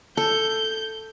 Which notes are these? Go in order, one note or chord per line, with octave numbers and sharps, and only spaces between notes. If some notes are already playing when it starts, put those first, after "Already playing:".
A4 G6